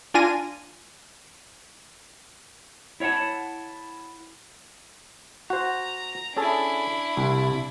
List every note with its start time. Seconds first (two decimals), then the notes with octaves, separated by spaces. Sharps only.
0.14 D4 F4 G#5 A#6 D#7
3.00 E4 C#5 F5 F#5 A5
5.50 F#4 C5 A#5
6.37 C#4 D4 E4 G#4 A4
7.17 C2 C3